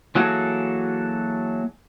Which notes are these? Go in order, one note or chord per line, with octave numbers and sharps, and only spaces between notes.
E3 F#3 A#3 F#4 G#4 A4